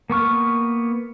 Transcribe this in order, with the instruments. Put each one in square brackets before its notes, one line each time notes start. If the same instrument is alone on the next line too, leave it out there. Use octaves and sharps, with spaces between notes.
[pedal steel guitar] A#3 B3 C#6 F6